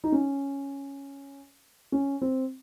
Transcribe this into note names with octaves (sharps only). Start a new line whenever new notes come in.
D#4
C#4
C#4
C4